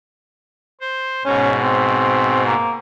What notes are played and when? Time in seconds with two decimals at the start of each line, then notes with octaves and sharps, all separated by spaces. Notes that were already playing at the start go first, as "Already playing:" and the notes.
0.81 C5
1.25 G#2 B2 C#4
1.63 C4
2.45 A#3